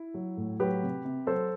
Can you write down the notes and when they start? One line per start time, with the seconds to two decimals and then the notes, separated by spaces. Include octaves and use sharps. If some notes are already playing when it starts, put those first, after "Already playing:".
Already playing: E4
0.14 F#3
0.37 A2
0.60 F#3 G4 B4
0.82 C3
1.05 C3
1.27 F#3 A4 C5